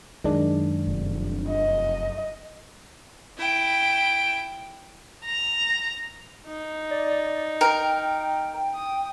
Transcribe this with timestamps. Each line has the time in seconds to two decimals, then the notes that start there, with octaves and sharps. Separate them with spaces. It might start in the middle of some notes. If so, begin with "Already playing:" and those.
0.24 F#2 D#3 G#3 D4
0.87 F1
1.48 D#5
3.38 E4 G5
5.25 A#5
6.47 D#4
6.91 D5
7.61 A#4 G5
8.74 D#6